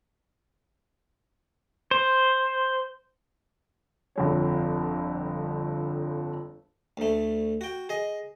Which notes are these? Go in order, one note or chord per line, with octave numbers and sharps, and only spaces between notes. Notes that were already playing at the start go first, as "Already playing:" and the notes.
C5
G1 F2 C#5
D2 A3
F#4 G5
G#4 D#5